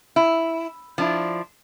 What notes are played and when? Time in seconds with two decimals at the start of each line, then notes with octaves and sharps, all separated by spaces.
0.16 E4
0.98 F3 D4 E4